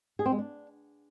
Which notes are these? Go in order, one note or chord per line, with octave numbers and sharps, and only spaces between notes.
G#4
C4
G#3
D4